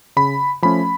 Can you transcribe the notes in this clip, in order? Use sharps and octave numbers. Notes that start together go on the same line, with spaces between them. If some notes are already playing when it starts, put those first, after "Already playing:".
C#3 B5
F3 A3 C#4 B5